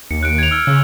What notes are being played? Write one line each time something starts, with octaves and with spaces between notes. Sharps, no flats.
D#2 C#7
F#6 C#7 D7
G#6 F7
E6 F6 G#6
C#3 C#6 E6